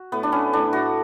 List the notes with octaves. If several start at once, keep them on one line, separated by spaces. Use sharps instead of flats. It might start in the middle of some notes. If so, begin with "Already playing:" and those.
Already playing: F#4
A2 B3
D4
B3 C#4
A2 D4
A2 F#4